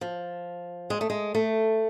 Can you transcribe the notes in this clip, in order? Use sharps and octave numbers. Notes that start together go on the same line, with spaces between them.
F3
G#3
A3
G#3
A3